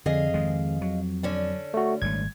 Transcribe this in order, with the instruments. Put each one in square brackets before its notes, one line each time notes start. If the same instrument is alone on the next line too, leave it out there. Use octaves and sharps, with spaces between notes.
[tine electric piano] F2 [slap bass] D3 [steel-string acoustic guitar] G#4 D#5 F5
[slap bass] D#3 G#3
F#3
[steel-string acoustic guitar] D3 C#4 D4
[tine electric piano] A3 F#4
[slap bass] G#1 G3 A3 [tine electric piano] G#6